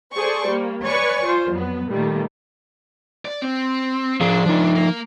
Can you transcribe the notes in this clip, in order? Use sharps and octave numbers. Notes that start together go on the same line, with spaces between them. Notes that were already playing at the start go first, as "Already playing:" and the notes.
G#4 A4 C5 D5 C#6
G3 A#3
B4 C#5 D5 G#5 C#6
F4 C5
F2 F#3 B3
A#2 D#3 G3 A3
D5
C4
F3 D4 G#4 F5
F3 D#4
A#3